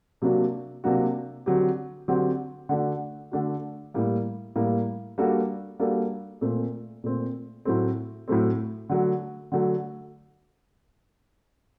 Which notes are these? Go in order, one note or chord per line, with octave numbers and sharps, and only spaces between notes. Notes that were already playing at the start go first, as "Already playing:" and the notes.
C3 F#3 A#3 D4 F#4
C3 F#3 A#3 D4 F#4
D3 F#3 C4 G4
D3 F#3 C4 G4
D3 A3 D4 F#4
D3 A3 D4 F#4
A2 G3 A#3
A2 G3 A#3
G3 A#3 D4 F#4 A4
G3 A#3 D4 F#4 A4
A#2 A3 C4
A#2 A3 C4
A2 F#3 A3 C4
A2 F#3 A3 C4
D3 F#3 A3
D3 F#3 A3